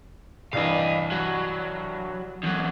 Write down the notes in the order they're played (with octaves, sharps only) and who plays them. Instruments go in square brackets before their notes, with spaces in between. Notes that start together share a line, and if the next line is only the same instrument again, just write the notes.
[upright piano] C2 G2 E3 [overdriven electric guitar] D#5 F5
[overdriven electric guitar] F#3
E2 F#3